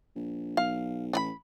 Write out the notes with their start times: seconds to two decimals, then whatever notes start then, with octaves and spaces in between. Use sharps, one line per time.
0.16 A#1
0.57 B1 F5
1.13 A1 D4 B5